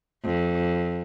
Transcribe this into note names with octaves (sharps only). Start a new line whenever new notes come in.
F2